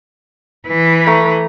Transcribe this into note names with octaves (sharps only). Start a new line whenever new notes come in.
E3 B4
A3 A#5